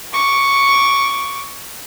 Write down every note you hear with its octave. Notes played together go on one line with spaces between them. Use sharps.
C#6 D6